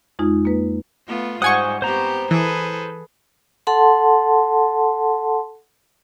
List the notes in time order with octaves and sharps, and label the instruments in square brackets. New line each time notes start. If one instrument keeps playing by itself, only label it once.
[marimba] F2 G#3 D#4 F4
A#3 B4
[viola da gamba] A3 B3 F4
[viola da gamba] G#2 G3 [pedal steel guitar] C5 D#6 [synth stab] F#5 G#5 C#6
[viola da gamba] B3 C4 G4 [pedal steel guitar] C5 A#5
[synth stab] E3 [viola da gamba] G#4 A4 B4
[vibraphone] A4 F#5 A5 C6